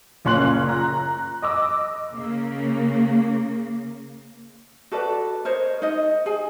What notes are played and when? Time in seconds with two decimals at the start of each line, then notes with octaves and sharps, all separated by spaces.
0.25 F#1 A#2 C#4 C6 F#6 F#7
0.69 A#5 F#6
1.42 D#5 D6 E6
2.14 C#3 A#3
4.92 F#4 A4 B4 D5
5.45 A#4 C5 C#5 D#5
5.82 D#4 D#5
6.26 G#4 G#5